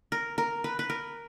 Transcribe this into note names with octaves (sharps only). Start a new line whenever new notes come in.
A#4
A#4
B4
B4
A#4